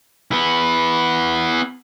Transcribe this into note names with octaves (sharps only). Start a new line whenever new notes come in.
B3 E4